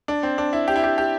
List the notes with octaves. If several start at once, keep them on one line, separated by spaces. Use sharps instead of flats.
D4
C4
D4
E4
G4
E4
G4
G4